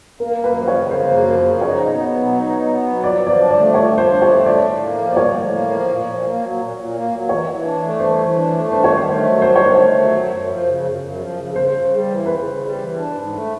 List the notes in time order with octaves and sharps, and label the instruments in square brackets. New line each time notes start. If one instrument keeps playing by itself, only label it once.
[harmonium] A#3 [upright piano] A#4
[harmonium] F#2
[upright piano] B4
[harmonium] F3
[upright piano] C#5
[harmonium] C#3
[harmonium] A#3 [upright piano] C5
[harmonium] F#2
F3
C#3
[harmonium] D#4 [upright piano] C#5
[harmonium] B2
B3
F#3
D#4
B2
B3
F#3
[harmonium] F3 [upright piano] D5
[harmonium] F3
[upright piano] D5
[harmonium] D4
[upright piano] D5
[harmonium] A3
[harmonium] F3 [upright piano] C#5
[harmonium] F3
[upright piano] C5
[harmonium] D4
[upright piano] C#5
[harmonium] A3
[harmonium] A2 [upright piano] D5
[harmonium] A2
A#3
F3
[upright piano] D5
[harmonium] A2 [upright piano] C#5
[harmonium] A2
A#3
F3
A#2
A#2
A#3
F#3
A#2
A#2
A#3
F#3
[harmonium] E3 [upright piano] C#5
[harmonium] E3
D4
A3
[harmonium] E3 [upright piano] C5
[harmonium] E3
D4
A3
[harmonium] D4 [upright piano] C5
[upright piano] C#5
[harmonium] D#3
[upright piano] C5
[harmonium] A3
F#3
[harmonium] D4 [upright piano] C5
[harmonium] D#3 [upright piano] C#5
[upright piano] C5
[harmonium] A3
F#3
F#2
F#2
F3
C#3
F#2
F#2
F3
C#3
[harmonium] C#3 [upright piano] C5
[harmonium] C#3
G3
E3
[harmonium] C#3 [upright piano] B4
[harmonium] C#3
G3
E3
D4
G#2
A3